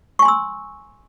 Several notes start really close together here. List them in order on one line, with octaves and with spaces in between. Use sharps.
C#6 G#5 C6 E6